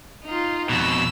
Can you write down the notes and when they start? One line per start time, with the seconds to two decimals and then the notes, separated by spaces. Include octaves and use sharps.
0.24 D#4 F4
0.69 F2 B2 E6